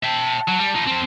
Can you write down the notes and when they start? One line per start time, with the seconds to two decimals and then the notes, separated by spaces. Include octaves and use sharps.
0.04 E5 G5 A5
0.48 F#3
0.59 G3
0.75 D#4 F4
0.87 F3 C4